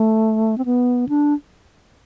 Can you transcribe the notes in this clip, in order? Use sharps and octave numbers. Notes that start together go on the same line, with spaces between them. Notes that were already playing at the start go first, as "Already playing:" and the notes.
Already playing: A3
C4
B3
D4